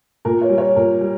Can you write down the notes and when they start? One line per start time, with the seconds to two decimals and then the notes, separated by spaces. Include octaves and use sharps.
0.25 A#2 A#4
0.41 C#5
0.49 G3
0.58 C#5
0.76 A#2 A#4
1.01 G3